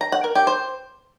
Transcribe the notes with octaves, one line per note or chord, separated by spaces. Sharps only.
A#5
F#5
A#4
G4
C5